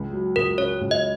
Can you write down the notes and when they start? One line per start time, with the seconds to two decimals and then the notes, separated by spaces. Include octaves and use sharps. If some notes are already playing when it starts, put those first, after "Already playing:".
Already playing: C#2
0.13 F#3
0.36 C#2 A#4
0.57 C#3 C#5
0.81 C#2
0.91 D#5